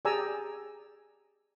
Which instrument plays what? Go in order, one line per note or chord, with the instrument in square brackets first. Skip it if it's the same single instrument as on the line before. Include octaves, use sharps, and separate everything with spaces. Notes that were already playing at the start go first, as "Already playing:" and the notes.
[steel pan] G4 G#4 D5 G#5 A#5 E6